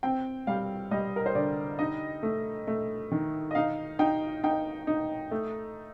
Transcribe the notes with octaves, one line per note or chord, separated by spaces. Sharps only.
C4 G5
G3 F5
G3 D#5
A#4
C5
D3 D5
D#4 D#5
A3
A3
D#3
D#5
D#4 F5
D#4 G5
D#4 G5
D#4
A3